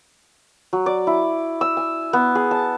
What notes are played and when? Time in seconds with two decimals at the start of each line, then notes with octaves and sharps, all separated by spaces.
0.73 F#3
0.86 D5
1.07 E4
1.61 E6
1.77 G#5
2.13 B3
2.35 G#4
2.51 A5